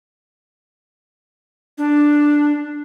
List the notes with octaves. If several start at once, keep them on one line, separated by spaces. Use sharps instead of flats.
D4